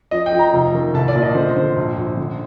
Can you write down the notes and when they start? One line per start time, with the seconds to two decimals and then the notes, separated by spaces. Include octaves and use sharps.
0.11 F3 D#5
0.26 G5
0.32 F3
0.39 A#5
0.53 F1
0.74 D#3
0.94 C2 A5
1.08 D5
1.15 A#2
1.22 D#5
1.35 D3 C5
1.56 D3 C5
1.77 A#1
1.98 A#1
2.17 D3